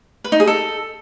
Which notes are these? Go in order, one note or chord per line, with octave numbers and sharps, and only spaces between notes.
B4
D#4
G#4
A4